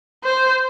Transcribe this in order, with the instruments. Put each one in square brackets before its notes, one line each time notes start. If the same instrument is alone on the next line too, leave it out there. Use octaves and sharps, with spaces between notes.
[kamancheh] C5